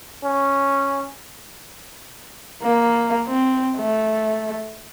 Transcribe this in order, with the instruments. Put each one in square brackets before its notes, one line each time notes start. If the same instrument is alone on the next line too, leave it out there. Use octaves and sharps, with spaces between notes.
[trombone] C#4
[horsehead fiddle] A#3
C4
A3